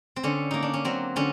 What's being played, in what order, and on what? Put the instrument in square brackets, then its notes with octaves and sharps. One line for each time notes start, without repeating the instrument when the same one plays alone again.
[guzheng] C4
D3 C#4
A#3 D#4
D4
C#4
F#3 C4
D3 C#4